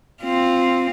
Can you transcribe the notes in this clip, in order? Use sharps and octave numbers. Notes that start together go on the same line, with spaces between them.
C4 F4